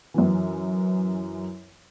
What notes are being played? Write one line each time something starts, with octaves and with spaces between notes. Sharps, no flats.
F#2 E3